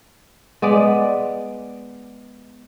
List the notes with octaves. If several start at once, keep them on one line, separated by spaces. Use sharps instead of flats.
G#3 B3 D5